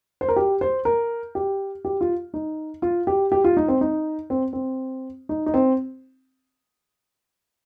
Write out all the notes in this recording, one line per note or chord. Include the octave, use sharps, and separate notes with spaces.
C5
A#4
G4
C5
A#4
G4
G4
F4
D#4
F4
G4
G4
F4
D#4
C4
D#4
C4
C4
D#4
D#4
C4